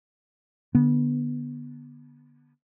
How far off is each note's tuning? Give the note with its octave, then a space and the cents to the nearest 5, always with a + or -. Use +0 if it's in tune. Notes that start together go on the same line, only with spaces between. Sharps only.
D3 +0 B3 -20